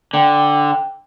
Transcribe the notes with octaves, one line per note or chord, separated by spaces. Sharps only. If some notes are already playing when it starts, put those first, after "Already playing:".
D3 G5